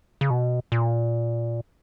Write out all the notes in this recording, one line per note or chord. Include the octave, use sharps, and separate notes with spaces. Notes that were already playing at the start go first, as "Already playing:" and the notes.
C#3
B2
A#2